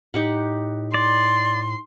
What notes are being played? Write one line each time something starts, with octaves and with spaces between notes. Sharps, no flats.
A2 D#4 G4 F#5
D5 C6